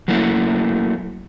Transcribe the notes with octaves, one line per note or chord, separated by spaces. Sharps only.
F#3 A3 A#3 E4